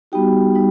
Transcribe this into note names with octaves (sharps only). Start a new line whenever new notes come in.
G3 B3 D#4 F#4 G4 G5
G3 D#4